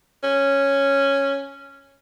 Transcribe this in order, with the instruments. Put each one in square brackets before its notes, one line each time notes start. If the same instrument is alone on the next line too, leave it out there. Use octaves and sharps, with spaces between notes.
[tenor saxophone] C#4